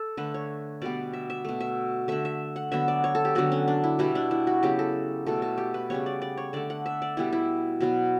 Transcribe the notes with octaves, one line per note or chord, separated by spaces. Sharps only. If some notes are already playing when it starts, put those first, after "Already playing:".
Already playing: A4
D3 A3 B4
C#5
B2 G3 B3 D5
E5
E5
B2 A3
E5
D3 A3 E5
E5
F#5
D3 F#3 B3 E5
D5
C#5
A4
G4
D3 F#3 B3 F#4
C#4
D4
E4
B2 G3 B3 E4
D4
E4
F#4
C#3 F#3 B3 G4
A4
B2 A3 A4
A4
G4
B4
C#3 G3 B3 C#5
D5
D5
C#5
D3 A3 D5
F#5
E5
D5
B2 G3 B3 E4
E4
B2 F#3 B3